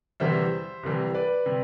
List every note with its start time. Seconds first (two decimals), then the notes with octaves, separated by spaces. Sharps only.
0.20 E2 C3 E3 G3 C5 E5
0.83 C2 C3 E3 G3
1.14 B4 D5
1.46 C3 G3